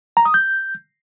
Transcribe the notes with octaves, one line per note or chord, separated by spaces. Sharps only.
A#5
D#6
G6